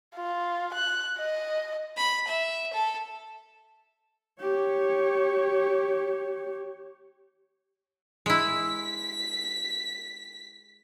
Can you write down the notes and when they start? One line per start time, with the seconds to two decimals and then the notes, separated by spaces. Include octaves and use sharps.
0.16 F4
0.75 F#6
1.18 D#5
1.97 B5
2.27 E5
2.73 A4
4.40 G4 C#5
8.26 G#3 E4 B6